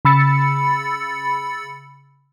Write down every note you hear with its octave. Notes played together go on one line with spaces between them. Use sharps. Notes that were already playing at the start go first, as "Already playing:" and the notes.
C#3 B5 E6 A6 C#7